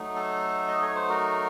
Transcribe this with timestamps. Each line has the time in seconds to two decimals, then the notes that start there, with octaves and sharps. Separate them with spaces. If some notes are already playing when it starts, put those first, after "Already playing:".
Already playing: F#3 A3 D#4
0.16 A4
0.68 D#5
0.82 C#5
0.95 C5
1.09 F#4 A#4